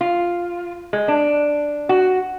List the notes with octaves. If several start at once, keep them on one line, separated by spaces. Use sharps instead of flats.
F4
G#3
D4
F#4